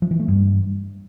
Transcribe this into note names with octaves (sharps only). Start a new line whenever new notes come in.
F3
E3
A3
G2